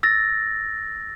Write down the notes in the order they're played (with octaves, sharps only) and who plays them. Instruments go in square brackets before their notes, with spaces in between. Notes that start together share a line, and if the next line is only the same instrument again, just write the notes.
[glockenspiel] E6 A6 A#6